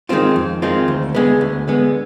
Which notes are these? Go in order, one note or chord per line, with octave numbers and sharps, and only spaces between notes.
D#3 G#3 C4 F4
F2
D#3 G#3 C4 F4
D2
D3 G#3 B3
D2
D3 G#3 B3